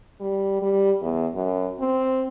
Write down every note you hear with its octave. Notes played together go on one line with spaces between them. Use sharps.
G3
G3
E2
F#2
C4